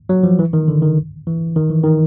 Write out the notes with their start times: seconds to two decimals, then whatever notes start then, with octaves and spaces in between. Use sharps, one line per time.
0.09 F#3
0.23 F3
0.39 E3
0.53 D#3
0.68 D3
0.82 D#3
1.27 E3
1.56 D#3
1.70 E3
1.84 D#3